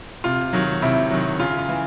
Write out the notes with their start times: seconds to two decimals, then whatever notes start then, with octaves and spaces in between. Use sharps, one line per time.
0.24 C3 F4
0.53 D#3 F#3
0.82 C3 E4
1.11 D#3 F#3
1.39 C#3 F4
1.58 F4
1.69 E3